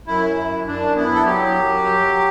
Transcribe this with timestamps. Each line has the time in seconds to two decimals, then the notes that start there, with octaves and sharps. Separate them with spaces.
0.07 F#2 E4
0.37 F#2
0.67 F#2 D4
0.96 B3 E4
1.15 A4
1.25 F#3 G4
1.55 F#2
1.84 F#3